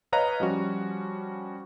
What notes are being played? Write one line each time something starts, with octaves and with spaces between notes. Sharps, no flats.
B4 C#5 D#5 F5 A#5 F#6
F3 G3 C#4 F#4